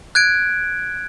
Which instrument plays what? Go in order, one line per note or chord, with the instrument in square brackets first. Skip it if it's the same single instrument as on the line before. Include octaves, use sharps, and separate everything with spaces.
[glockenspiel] F#6 G#6 D7